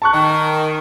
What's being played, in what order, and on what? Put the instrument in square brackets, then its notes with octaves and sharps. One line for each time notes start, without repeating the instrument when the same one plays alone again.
[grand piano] A5 C#6 F#6
[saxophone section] D#3